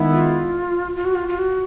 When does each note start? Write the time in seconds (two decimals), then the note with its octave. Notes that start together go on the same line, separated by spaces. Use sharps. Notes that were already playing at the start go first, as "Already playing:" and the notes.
Already playing: D#3 G#3 B3 E4
0.13 F4
0.96 F4
1.05 F#4
1.15 F4
1.28 F4
1.39 F#4